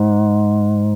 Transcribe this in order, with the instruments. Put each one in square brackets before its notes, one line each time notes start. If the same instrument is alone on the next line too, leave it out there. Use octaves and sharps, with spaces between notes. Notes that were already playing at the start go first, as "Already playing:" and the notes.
Already playing: [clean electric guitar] G#2